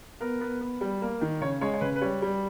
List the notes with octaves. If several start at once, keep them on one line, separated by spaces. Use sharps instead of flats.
B3 A#4
B3
B3
G3
A#3
D#3
C#3 C#5
G#3 C#5
C#5
C#3 B4
B4
G3 C#5
G3